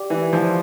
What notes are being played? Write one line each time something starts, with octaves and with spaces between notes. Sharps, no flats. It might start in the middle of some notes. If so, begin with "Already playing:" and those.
Already playing: G4 D5 G5 D6
E3
F3